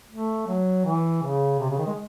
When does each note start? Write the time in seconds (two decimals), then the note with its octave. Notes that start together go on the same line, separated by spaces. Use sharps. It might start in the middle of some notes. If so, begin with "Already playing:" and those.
0.11 A3
0.48 F#3
0.85 E3
1.22 C#3
1.60 C3
1.69 C#3
1.78 D#3
1.87 G#3